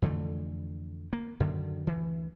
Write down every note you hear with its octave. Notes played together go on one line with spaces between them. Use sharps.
F2 D3 E3 A3
A#3
F#2 D3 D#3
D2 E3